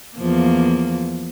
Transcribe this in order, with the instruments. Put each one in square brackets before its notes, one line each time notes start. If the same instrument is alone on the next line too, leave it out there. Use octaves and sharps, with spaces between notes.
[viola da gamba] E2 F3 A#3